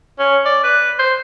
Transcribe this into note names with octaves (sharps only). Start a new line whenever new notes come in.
C#4
D5
B4
C5